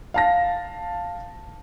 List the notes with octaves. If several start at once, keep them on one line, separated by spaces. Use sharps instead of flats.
F5 A5 A#6